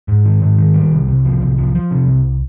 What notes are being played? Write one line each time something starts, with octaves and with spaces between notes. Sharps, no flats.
G#2
D#3
G#2
D#3
G3
C2
C2
F3
C2
F3
F3
C3
C2